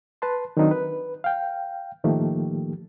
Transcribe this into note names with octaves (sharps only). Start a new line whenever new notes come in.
B4 A5 C6
D#3 F#3 C4 D4 D#4
B4
F5 G5
A2 D#3 F3 A3 A#3 G4